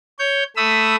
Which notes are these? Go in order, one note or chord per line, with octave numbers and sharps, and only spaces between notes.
C#5 G6
A3 B5 D#6 E6